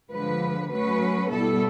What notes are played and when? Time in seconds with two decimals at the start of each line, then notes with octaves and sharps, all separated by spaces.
0.12 D3 F3 G#3 B4
0.71 F#3 A3 C#4 B4
1.30 B2 G3 B3 E4 A4